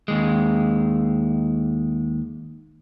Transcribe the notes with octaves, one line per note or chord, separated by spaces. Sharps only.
D#2 G#3